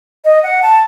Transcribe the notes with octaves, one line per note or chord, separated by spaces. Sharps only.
D#5
F#5
A5